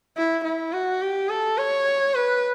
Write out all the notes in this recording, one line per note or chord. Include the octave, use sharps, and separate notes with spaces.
E4
E4
F#4
G4
A4
C#5
B4